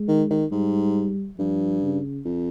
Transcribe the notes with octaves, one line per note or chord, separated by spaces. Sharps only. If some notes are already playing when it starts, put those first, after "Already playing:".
Already playing: G#3
D#3
D#3
G#2 G3
G2 F3
C#3
F2